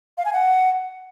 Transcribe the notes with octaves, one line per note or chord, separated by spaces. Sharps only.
F5
G#5
F#5